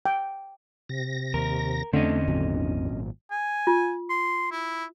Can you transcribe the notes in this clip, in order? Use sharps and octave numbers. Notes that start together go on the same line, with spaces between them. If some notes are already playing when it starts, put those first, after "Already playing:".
G5
C3 A#6
D#2 A#4
E2 D3 A3 C4 C#4 D#5
G#1 A#2 F#3
G#5
F4
C6
E4